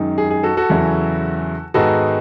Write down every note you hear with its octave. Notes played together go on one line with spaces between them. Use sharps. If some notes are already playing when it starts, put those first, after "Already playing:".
Already playing: F#2 D#3 G#3 D#4
G#4
G#4
F#4 A4
F#4 A4
E2 C#3 F#3 C#4 E4
G#2 D#3 G#3 B3 D#4 F#4 A4